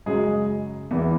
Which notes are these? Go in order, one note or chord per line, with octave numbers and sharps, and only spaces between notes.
F#2 C#3 F#3 G#3 G#4
E2 E3